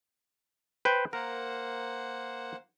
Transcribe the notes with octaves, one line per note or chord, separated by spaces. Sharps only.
B4 C5 G5
A#3 A#4 C5 F#5